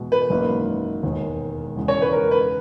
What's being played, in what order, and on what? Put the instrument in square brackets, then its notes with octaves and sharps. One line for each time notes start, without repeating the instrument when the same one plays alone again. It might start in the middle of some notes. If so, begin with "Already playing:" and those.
Already playing: [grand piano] E2 B2 G#3
[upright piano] B4
[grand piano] G#1 F#2 E3 A#3 D#4
E1 D#2 D#3 G#3 B3
E2 C#3 G#3
[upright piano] C#5
B4
A#4
B4